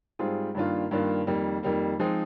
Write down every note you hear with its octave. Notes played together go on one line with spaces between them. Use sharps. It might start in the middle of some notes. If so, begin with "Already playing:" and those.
G#2 G3 C4 F4 G#4
G2 D#3 A#3 D4 F4
G2 D#3 A#3 D4 F4
F2 D#3 G3 A#3
F2 D#3 G3 A#3
F3 G#3 C4 D#4